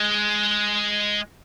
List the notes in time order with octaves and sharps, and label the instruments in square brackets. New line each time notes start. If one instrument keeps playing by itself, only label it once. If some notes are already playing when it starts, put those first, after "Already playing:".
Already playing: [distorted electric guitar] G#3